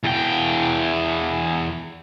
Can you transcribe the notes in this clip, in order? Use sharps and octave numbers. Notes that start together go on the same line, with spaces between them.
E2 G5